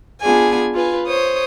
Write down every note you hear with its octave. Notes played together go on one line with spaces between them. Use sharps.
B3 D4 F4 G#4 G#5
F4 B4 G#5
C5 C#5 D#6